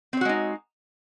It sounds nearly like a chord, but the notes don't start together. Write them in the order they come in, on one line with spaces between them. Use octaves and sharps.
C4 C#5 F#4 G#3 D#4